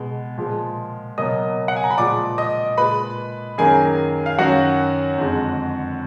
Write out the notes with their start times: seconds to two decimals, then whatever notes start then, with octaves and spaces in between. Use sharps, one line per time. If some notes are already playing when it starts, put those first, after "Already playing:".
Already playing: B2 G#3
0.38 A#2 F3 G#3
1.18 B2 F#3 A#3 D#5 D#6
1.68 F#5
1.76 G#5
1.84 A#5
1.91 B5
1.98 A#2 F3 G#3 D5 D6
2.38 D#5 D#6
2.78 A#2 G#3 B4 B5
3.58 F#2 D#3 F#3 A#3 G#4 G#5
4.26 F5
4.38 F#2 D#3 F#3 F#4 F#5
5.18 F2 D3 G#3